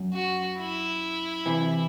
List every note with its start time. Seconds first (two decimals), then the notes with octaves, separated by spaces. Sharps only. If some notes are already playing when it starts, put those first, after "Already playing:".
Already playing: F#2
0.14 F#4
0.58 E4
1.46 C3 E3